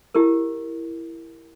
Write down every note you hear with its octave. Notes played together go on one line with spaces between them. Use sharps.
E4 G4 A#4